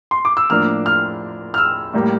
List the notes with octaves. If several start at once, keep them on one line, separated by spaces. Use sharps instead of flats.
C6
D6
E6
A2 F3 A#3 D4 F6
F6
F6
E6
A2 G3 A#3